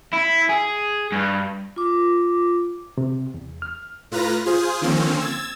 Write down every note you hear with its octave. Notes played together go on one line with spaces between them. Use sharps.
E4
G#4
G2
F4 D6
C3
E2
F6
A2 F4 B4 A#5 A#6
F4 G#4 C5
D3 D#3 F3 A#3 C4 C#4
E6 G#6 A6